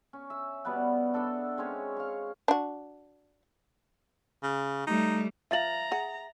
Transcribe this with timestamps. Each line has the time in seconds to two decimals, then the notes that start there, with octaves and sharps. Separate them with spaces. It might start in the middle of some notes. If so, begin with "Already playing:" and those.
0.13 C#4
0.30 E5
0.65 B2 G3 B3 F#5
1.14 D4 A4 D5 E5
1.57 G#3 C4 C#4 C#5
1.97 F5 C#6
2.48 D4 F#4
4.43 C#3
4.87 G3 A3 D#4
5.51 F3 E5 F5 A#5 A6 F#7
5.92 G#4 F#5